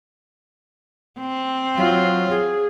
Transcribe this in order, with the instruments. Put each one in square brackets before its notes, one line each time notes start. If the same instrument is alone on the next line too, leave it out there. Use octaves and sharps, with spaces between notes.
[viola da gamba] C4
[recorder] F#3 [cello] F4
[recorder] G#4